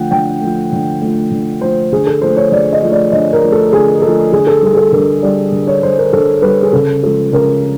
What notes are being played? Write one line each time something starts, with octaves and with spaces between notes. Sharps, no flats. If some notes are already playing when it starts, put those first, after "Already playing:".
Already playing: D3 F3 A3 F#5 G5
D3 G5
F3 A3
D3
F3 A3
D3
F3 A3 C5
D3 G#4
A4
F3 A3 C5
C#5
D3 D5
D#5
F3 A3
D5
D3 D#5
A#4
F3 A3
A4
D3 G#4
F3 A3 A4
D3 G#4
A4
G3 G#4
G#4
A4
D3 A#4
G3 D5
D3
C#5
G3 C5
A#4
D3 A4
G3 B4
G#4
C#3 A4
F3 G#3 A4
C#3 A#4